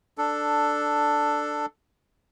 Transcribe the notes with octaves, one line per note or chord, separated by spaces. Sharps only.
D4 A4